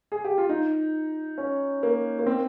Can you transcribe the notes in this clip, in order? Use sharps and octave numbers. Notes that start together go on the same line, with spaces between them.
G#4
G4
F4
D#4
C#4
A#3
A#3
C4